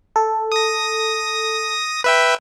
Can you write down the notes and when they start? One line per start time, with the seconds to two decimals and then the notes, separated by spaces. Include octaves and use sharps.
0.16 A4
0.52 D#6 A#6
2.04 B4 E5 G5